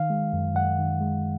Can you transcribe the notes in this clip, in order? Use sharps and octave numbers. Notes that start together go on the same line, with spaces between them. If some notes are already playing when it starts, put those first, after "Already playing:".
Already playing: D#3 F5
G#3
F#2
F#2 F#5
D#3
G#3